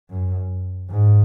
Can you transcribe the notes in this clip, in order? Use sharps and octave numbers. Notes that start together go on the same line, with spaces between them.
F#2
G#2